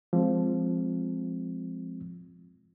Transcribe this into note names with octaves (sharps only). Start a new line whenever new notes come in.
F3 G#3 C4